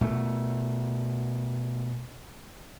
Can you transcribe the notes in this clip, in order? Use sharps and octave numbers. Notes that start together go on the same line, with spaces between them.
B2 A3